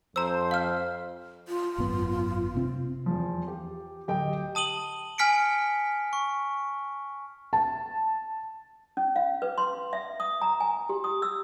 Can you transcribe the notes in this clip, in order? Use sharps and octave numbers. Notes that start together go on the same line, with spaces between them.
F2 C5 A#5 E6
F5 F6
F4
G#1 F#2 B3
C3 C4
E2 F3
G4
D1 G4 D#5 G5
A5 D#6 D#7 F#7 G7
G#5 F6 B6 C#7 D7
C#6
A5
C#4
F5
B4
C6
E5
D#6
A#5
G#5
G4
D#6
E6